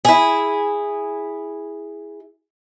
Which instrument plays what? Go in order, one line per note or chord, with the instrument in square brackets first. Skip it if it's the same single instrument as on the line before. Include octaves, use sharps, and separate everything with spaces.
[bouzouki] E4 G#4